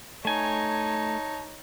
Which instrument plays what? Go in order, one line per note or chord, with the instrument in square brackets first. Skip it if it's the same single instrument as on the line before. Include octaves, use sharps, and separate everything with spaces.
[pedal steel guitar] A3 G#5 [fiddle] D#4 C#5 [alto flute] A5